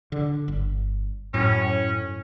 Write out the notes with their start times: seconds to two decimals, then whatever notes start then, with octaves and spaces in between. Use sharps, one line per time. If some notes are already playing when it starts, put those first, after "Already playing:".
0.12 D3
0.48 G1
1.34 F#2 A2 C#4